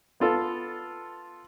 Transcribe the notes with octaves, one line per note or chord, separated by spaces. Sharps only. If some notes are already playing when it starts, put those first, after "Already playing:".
B3 F4 A4